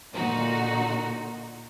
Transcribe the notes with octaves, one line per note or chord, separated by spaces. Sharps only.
A#2 D3 D#4 F#4